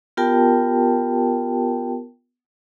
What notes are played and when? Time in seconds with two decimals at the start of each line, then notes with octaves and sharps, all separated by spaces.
0.17 B3 F4 G4 A#4 G5 A5